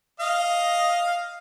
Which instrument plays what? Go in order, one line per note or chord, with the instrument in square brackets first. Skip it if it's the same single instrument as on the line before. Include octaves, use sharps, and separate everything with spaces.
[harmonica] D#5 F5